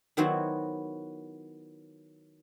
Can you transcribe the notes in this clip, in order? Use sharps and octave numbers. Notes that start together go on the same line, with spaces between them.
D#3 F#3 B3 E4 F#4 C5